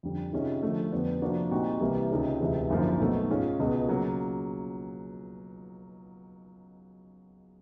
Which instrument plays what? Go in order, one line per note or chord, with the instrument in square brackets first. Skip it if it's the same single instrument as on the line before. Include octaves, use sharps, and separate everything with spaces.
[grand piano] F2 D3 G3
C3 D#3 G#3 C#4 F4
D3 F3 A3
F2 D3 G3 B3 D4
C3 F3 A#3 D4 F#4
A#2 G3 C4 D#4 F#4
C2 C3 E3 G3 A#3
C#2 C3 D#3 G#3 C#4
E1 D2 C3 E3 G#3
G#1 F#2 D3 F3 A#3
B1 B2 F#3 A3
G#2 D#3 G#3 C#4 F4
C#2 B2 G#3
C#3 F#3 A#3